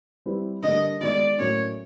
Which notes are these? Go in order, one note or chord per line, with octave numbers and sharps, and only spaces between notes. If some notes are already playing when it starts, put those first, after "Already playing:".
G3 C4 E4 G4 B4
D3 G3 A#3 D#5
D#3 G#3 B3 D5
A2 F#3 A#3 C#4 C#5